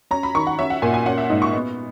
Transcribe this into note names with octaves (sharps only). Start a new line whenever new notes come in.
C#4 A#5
B5
D#3 C#6
F#5
C#4 E5
F#5
A#2 G#5
G#5
C#4 F#5
E5
G#2 D#5
C#6
B3